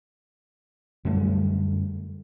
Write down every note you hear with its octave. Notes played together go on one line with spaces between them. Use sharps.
F#2 D3 G3 A3